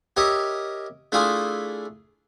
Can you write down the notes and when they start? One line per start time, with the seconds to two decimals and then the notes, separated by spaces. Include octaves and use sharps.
0.17 G4 A#4 C#5 D#5 E5
1.12 A3 D4 E4 F4 G#4